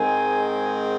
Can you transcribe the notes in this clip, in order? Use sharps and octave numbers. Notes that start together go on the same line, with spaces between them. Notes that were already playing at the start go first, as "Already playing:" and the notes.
Already playing: G#2 D#3 G#3 C4 G#5
G#5